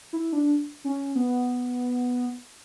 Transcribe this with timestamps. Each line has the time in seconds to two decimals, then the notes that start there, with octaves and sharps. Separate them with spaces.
0.13 E4
0.33 D4
0.84 C#4
1.15 B3